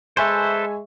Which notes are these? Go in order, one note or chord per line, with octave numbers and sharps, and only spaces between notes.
G#3 A4 B4 C5 E5 G#5 C#6